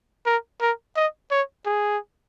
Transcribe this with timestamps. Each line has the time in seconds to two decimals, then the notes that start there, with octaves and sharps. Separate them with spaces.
0.26 A#4
0.61 A#4
0.96 D#5
1.31 C#5
1.66 G#4